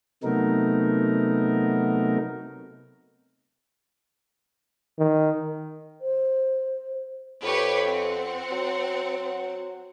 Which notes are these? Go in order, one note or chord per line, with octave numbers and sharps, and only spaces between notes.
C3 F#3 A3 B3 D#4 A#4
D#3
C5
F2 G4 B4 C#5
C4 F#5
F#3